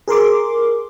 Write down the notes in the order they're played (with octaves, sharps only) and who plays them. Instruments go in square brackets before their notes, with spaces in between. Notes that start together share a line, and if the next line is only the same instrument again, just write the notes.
[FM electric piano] G#4 A#4 C6 D6